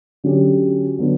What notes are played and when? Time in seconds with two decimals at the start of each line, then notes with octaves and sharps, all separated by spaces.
0.24 D3 F#3 C#4 G4
0.99 D3 F#3 B3